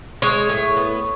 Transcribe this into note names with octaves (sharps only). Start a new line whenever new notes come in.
G#3 C#5
A2
B3